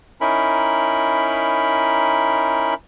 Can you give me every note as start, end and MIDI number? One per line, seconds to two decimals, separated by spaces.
0.21 2.74 61
0.21 2.74 63
0.21 2.74 64
0.21 2.74 70
0.21 2.74 83